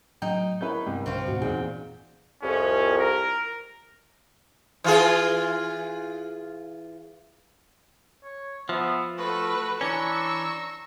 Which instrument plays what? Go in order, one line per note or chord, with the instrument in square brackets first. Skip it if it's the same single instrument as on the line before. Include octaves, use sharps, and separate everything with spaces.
[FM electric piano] A2 F#3 D#5 [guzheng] D#4 [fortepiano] G5
[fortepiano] C#4 E4 B4 [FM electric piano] A#4 G6
[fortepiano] C2 [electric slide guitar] G2
[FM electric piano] B1 D3 [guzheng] C4 C#4 F4
[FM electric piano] D2 G#2 B2 [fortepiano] F#4
[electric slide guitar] E2 A#2 [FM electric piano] D#4 D5 F#5 [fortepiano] G#4 [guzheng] G5
[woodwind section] C2 F2 [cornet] C#4
[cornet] A#4
[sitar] E3 F4 G#4
[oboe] C#5
[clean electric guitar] F3 [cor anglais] B3 [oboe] E5
[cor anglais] A3 [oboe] F#4 [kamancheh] A4 B4
[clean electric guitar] E3 C#4 [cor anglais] D4 [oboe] A#5 [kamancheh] C#6 E6